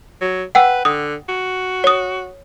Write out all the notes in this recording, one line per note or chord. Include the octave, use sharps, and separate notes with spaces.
F#3
B4 F#5 G5 E6
D3 D#6
F#4
C#5 D#6